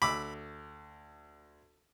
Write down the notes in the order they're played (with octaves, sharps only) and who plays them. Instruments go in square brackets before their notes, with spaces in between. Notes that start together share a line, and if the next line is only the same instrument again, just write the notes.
[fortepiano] D2 D6 E6 [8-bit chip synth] B5